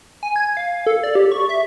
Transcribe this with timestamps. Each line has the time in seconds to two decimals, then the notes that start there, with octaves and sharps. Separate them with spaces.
0.23 G#5
0.36 G#6
0.57 F5
0.86 A4
1.03 D5
1.15 G4
1.31 C#6
1.49 E5